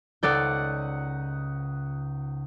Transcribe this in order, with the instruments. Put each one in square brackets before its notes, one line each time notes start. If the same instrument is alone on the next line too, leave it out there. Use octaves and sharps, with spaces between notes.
[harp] C#2 C5 [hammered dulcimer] D#4 F#5 [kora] A4 D5 G5